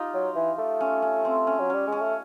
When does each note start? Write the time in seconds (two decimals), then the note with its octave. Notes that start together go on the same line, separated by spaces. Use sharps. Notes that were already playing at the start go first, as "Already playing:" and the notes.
Already playing: D#4 F4 G4
0.14 F#3
0.36 E3
0.58 A3
0.81 C#4
1.02 C#4
1.25 C4
1.47 C#4
1.59 F#3
1.70 G3 C#4
1.87 G#3
1.92 C#4
2.01 A3